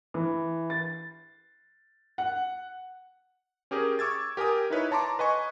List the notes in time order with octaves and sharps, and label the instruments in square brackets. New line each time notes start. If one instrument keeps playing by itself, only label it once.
[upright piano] E3
A6
F#5
[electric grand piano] C#4 G4 G#4 A#4
C#6 D6 E6 G#6 A6
G4 A#4 G5 G#5 D#6
D#4 E4 B4 C#5
C#5 A5 A#5 C6 D6
B4 D#5 G#5 C#6